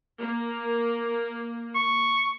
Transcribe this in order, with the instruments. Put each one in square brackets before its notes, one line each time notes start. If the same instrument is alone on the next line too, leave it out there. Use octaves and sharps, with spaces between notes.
[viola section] A#3
[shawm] C#6